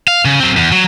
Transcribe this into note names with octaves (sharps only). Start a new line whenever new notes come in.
F5
C#3
F#3 C4
E2
F#3